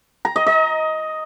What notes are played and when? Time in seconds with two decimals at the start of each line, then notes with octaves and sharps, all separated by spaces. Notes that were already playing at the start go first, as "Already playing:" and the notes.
0.25 A#5
0.36 D#5
0.46 D#5